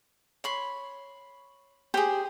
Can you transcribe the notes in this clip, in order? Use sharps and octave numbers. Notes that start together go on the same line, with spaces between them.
C#5 B5 C6
G4 G#4 C5